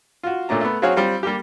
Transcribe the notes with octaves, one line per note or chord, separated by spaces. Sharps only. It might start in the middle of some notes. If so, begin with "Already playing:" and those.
F4 F#4
A#2 A3 C#4 D4 A#5
A3 B3
F#3 C4 F#4 G#4 C#5 F5
G3 C4 F4
G3 A#3 G4